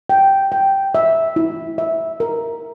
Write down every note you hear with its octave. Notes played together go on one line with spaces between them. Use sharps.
G5
G5
E5
E4
E5
A#4